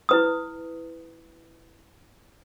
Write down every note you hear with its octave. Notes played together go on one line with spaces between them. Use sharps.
E4 B4 D#6